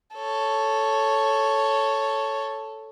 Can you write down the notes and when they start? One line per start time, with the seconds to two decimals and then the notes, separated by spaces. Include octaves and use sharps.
0.15 A4 C#5